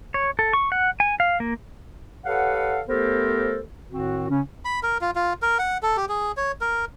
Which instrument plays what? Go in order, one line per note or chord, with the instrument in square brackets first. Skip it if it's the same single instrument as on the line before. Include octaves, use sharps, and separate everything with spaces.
[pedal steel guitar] C#5
A4
C#6
F#5
G#5
F5
A#3
[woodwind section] G4 A4 B4 C#5 F5 F#5
A3 B3 G4 A4 A#4 C5
A2 D#3 C4 F#4
C#3 C#4
[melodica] B5
A#4
F4
F4
A#4
F#5
A4
G4
G#4
C#5
A#4